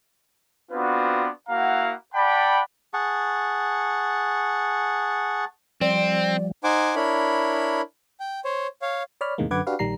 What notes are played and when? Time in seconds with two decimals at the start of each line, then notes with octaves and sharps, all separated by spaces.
0.72 B3 C4 D4 F4 F#4 B4
1.49 A#3 E4 F#4 F5 F#5 A#5
2.14 D5 F#5 G5 A5 B5
2.94 G#4 F#5 A5 C#6
5.81 F3 G3 C4 D5
6.64 D#4 C5 F#5 G#5 D6
6.96 D4 E4 A#4 C#5 B5
8.20 G5
8.44 C5 C#5
8.82 C#5 F5
9.21 C#5 D5 B5 F6
9.38 E2 A2 C3 D#3 G#3 A#3
9.51 F#2 D3 B4 F#5 D6 G#6
9.67 D4 F#4 G4 B4 F5
9.79 A#1 D#3 G3 A#5 C7